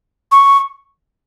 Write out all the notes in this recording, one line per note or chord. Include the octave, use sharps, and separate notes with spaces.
C#6